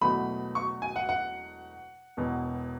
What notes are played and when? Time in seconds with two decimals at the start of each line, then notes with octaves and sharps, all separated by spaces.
0.01 E1 E2 B2 F#3 A3 B5
0.55 C#6
0.82 G#5
0.96 F#5
1.09 F#5
2.17 E1 E2 B2